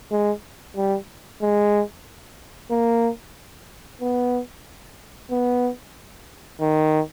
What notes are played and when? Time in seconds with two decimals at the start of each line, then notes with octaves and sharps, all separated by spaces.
0.12 G#3
0.76 G3
1.42 G#3
2.71 A#3
4.01 B3
5.31 B3
6.61 D#3